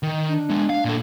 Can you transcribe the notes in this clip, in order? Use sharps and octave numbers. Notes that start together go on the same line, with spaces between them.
D#3
D4
G#3 B3
F5
A#2 A4